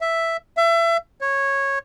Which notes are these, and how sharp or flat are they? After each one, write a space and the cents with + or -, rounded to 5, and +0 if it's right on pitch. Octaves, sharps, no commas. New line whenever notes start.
E5 +0
E5 +30
C#5 -15